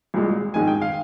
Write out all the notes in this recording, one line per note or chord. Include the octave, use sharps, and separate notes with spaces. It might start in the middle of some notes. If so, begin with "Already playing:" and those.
C2 A#2 G#3
A#1 G#2 D#3 G#3 G#5
G5
F5